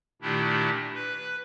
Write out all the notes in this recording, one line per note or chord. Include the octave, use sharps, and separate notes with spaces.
A#2 D#3 A3 D4 E4 G4
B4